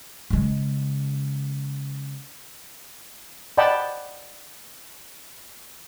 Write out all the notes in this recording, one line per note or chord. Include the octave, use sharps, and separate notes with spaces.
C#3 G#3
D5 D#5 F#5 G5 A5 B5